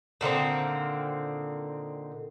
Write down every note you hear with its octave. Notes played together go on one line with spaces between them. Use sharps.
A#2 D3 D#3 C4